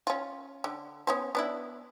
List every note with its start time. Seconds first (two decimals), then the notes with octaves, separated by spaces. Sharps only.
0.07 C#4 F4
0.64 D3
1.07 B3 C#4 C5
1.35 B3 D4 E4